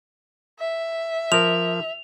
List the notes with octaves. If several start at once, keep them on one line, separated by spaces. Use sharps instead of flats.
E5
F3 A#4 F7